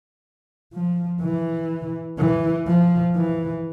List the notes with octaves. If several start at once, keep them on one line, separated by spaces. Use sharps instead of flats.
F3
E3
E3
F3
E3